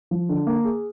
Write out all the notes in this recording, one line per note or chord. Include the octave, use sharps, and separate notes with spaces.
F3
D3
A#3
G#4